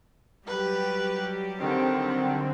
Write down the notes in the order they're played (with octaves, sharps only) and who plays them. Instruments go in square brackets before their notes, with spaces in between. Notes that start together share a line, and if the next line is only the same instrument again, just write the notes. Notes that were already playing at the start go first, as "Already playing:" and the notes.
[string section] F#3 G3 G4 [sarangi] B4
[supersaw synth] D3 C4 [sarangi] D#3